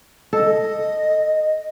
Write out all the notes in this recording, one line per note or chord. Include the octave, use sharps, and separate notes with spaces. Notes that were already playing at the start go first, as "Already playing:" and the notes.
A4 D#5